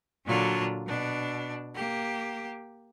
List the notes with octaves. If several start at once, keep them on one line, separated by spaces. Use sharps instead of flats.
A#2 D3 F#3 D4 F4
B2 D4
A#3 G4